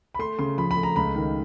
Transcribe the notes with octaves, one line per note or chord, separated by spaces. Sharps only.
B5
A3 C6
C#3 C6
F3 B5
B5
A3
A#5
C#2 B5
D#3